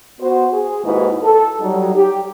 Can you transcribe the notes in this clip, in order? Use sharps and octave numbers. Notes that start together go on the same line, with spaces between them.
B3 F#4 C5
G#4
D#2 G#2 D#4 E4 F#4 B4
A4
F#3 G3 D#4
G4